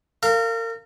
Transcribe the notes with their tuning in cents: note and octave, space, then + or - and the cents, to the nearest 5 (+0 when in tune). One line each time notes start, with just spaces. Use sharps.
A#4 -35 F5 -10